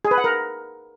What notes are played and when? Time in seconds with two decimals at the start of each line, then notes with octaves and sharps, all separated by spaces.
0.05 G#4
0.11 B4
0.18 F#5
0.24 A#4